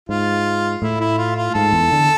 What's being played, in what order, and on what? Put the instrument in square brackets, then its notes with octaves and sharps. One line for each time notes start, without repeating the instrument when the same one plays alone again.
[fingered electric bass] G#2 [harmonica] F4
[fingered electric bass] A2 [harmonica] E4
[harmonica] E4
F4
F4
[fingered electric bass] G#2 [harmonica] A4
[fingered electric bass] E2
D3